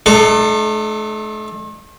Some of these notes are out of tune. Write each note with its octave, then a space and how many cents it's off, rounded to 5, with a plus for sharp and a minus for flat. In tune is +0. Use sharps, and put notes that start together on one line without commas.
A3 -40 D4 +45 A4 +0